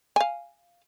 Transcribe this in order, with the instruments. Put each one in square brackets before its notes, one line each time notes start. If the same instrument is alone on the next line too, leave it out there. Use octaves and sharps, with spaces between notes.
[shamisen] F5 G#5